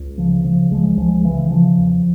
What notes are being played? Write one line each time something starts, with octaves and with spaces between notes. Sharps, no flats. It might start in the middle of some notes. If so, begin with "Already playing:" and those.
Already playing: C#2
C#3 F3
C#3 F3
C#2 F3 G#3
C#2 F3 G#3
C#3 E3
C#3 F3
E2